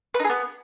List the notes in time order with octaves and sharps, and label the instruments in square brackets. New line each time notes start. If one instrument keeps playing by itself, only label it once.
[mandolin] B4
D#4
G#4
B3